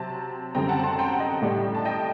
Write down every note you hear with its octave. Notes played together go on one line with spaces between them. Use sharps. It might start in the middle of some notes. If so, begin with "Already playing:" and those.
Already playing: C3 F#3 C4 A5
F#2 D3 G3 C4 G5 A#5
F#5 A5
A5 C6
G5 A#5
F#5
D#5 G5
A2 G3 D4
A5
D#5 G5